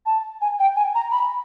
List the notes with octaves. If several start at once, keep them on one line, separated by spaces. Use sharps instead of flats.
A5
G#5
G5
G#5
A#5
B5